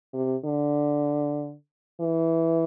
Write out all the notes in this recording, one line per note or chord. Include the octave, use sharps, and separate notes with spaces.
C3
D3
E3